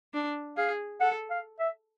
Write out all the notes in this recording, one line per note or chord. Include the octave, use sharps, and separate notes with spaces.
D4
G#4 F5
A4 F#5
F5
E5